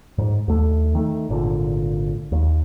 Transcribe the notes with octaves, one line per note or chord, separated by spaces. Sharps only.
G#2
D#2 A3
D#3 A3
G#1 A#2 D3
D#2